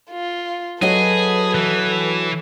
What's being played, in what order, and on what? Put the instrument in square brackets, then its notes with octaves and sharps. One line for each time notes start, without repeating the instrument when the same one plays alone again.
[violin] F4
[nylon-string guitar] F#3 F#4 D#5 [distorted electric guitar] G#4 [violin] A4 B4
[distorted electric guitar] E3